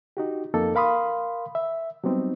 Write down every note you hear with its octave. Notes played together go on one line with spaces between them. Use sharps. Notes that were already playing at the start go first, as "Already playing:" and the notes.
D#4 F#4 G4
F2 A#3 D#4 A4
A#4 F5 B5 C6 D#6
E5
F#3 G3 B3 C4 D#4